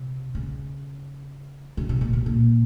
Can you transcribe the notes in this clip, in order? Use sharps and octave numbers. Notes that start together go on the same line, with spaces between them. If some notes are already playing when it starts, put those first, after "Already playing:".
Already playing: C3
C#3
C#3
C3
A#2
C3
A#2